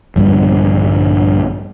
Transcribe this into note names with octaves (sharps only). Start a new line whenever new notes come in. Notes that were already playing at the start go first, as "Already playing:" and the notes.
A#1 G2 D3 G3